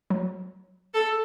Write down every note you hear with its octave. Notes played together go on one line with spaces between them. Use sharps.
F#3
A4